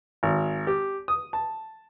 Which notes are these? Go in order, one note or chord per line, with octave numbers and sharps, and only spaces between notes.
G#1
G4
D#6
A5